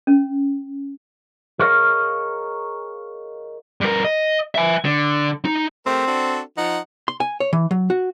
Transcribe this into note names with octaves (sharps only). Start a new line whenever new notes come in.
C#4
G#4 A#4 C#5 D#5 F5
G2 A#4
D#5
E5 G#5
D3
D#4
A3 C4 G4 A#4
D4 F#4 A4
F3 D#4 F#5
C6
G#5
C#5
E3
F#3
F#4